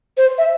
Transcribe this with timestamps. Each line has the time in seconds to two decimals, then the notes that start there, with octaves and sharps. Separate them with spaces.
0.17 C5
0.38 E5